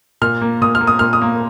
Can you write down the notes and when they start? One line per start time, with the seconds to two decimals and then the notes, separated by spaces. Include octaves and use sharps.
0.22 A#2 F6
0.41 A#3
0.61 A#2 D#6
0.75 F6
0.81 A#3
0.87 D#6
0.99 A#2 F6
1.13 D#6
1.21 A#3